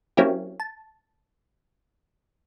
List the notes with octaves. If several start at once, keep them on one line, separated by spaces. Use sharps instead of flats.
F#3 A#3 C4 C#4 E4 G4
A5